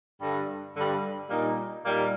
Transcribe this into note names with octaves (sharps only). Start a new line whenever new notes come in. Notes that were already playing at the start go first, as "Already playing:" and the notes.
G2 D3 G3
G2 D3 G3
A#2 G3 A#3 D#4
A#2 G3 A#3 D#4